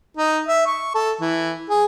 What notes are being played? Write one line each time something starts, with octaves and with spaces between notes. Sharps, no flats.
D#4
E5
C#6
A4
E3
G#4